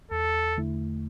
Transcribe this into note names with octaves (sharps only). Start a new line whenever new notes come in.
E2 A4
D3 A3 E4